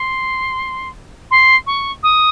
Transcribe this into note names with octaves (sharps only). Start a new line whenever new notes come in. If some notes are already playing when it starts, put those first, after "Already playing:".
Already playing: C6
C6
C#6
D#6